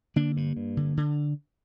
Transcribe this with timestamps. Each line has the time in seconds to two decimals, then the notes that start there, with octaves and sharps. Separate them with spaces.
0.16 D3 A#3 D4
0.37 G2
0.57 G2
0.77 D3
0.97 D3